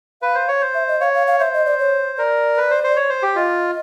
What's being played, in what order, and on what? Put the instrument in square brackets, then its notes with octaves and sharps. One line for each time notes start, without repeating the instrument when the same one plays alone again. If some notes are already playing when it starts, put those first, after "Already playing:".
[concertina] B4 [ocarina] F5
[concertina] C5
C#5
C5
[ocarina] E5
D#5
[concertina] C#5 [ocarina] F5
[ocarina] F5
F5
[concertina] C5 [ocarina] E5
[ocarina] D#5
D5
C#5
[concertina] A#4 [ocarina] D5
[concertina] B4
C5
C5
C#5
C5
G4
[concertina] F4 [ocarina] D#5